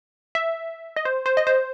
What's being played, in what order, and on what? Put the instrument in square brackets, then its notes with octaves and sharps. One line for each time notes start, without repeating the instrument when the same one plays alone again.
[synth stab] E5
D#5
C5
C5
D#5
C5